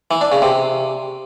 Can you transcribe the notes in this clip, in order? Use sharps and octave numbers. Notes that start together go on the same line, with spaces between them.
E3
D4
C#3
C3